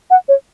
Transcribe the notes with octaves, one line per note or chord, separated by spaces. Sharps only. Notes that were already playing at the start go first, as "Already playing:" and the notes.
F#5
C#5